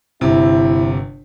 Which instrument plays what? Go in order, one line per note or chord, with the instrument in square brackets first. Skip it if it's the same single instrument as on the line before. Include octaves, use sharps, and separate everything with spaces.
[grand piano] G1 C3 [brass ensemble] E4